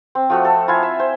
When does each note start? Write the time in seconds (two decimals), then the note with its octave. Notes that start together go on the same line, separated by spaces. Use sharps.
0.15 C4
0.30 F3 A3 F#4
0.45 A4
0.68 E4 F4 G#5
0.83 E5
1.00 C5